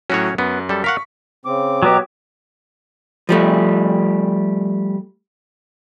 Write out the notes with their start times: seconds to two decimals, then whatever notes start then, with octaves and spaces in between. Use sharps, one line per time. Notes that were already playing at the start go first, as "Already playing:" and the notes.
0.10 A2 F#3 C#4 F#4 C#5
0.38 F#2 B3
0.69 G3 A4
0.84 A#4 F5 F#5 C#6 B6
1.45 C#3 C4 D6
1.83 B2 F#3 B3 G4 A#5
3.29 F3 G3 A3